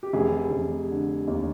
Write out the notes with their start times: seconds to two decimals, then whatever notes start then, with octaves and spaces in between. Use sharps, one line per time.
0.03 G4
0.13 F1 G#4
0.51 F1
0.90 D3
1.27 D#2